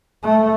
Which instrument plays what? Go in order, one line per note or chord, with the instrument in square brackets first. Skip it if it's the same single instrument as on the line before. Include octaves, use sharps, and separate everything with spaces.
[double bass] A3